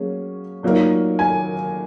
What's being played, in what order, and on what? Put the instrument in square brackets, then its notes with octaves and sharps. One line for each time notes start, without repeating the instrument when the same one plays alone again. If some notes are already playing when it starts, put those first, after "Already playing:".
Already playing: [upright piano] F#3 A#3 C#4 G#4
A#2 F#3 A#3 D#4 A#4
[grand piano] G#5